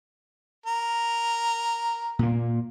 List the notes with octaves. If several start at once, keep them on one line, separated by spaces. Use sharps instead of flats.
A#4
A#2 A#3